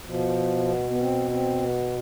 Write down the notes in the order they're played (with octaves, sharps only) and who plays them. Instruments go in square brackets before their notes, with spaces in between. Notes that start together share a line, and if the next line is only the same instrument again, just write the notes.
[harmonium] B2 F3
B3
B3
C4
C4
B3